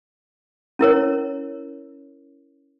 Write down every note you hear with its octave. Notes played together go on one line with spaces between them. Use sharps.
C#4 E4 A#4 C#5